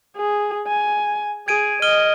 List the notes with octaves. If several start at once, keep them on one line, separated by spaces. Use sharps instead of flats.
G#4
G#5
G#4 G#6 D7 D#7
D#5 F6 D#7 G7